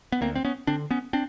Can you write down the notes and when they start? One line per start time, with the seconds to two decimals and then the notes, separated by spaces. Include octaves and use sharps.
0.12 B3
0.21 D2 A#3 C4
0.36 C4
0.45 B3 C#4
0.67 D3 C4 D4
0.91 B3 C#4
1.13 C4 D4